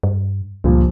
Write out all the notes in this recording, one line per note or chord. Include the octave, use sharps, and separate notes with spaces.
G2
C#2 G2 A#2 F3